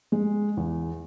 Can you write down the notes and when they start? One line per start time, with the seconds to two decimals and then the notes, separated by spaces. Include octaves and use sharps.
0.12 G#3
0.57 E2